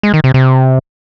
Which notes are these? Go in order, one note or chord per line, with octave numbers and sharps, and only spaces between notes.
G#3
D#3
C3
C3